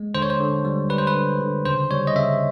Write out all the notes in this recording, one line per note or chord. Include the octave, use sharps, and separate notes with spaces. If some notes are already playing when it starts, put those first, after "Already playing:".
Already playing: G#3
D3 C5
C#5
C5
D3
G3
G3 B4
C5
B4
D3
D3
C#3 C5
G3 C#5
D#5
C#3 E5